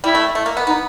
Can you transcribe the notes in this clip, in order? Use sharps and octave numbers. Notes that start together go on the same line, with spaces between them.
G3 E4
A3
A3
A#3
B3
B3 D#4